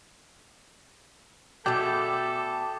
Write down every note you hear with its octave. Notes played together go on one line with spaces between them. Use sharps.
B2 A3 G#4 A4 D5 G5 D6